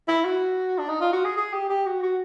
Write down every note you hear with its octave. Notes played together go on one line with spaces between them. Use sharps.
E4
F#4
D4
D#4
F4
F#4
G#4
G#4
G4
G4
F#4
F#4